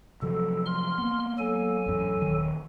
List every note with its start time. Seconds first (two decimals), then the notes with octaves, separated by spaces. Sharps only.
0.22 C3 F3 F#3 A4
0.66 C6 F6
0.98 A#3 B3
1.38 F#3 A4 G#5
1.86 A1 F#2
2.22 D#1 D#3